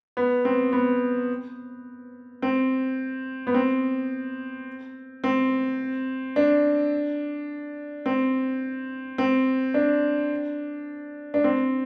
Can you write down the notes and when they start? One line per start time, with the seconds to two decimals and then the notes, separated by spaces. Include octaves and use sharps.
0.17 B3
0.45 C4
0.73 B3
2.42 C4
3.47 B3
3.54 C4
5.24 C4
6.36 D4
8.06 C4
9.18 C4
9.74 D4
11.34 D4
11.44 C4